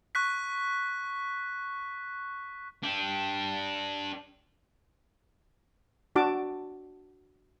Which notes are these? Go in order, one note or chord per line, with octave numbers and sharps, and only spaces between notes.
C#6 F#6 B6
D4 G4
D4 F#4 A5 D6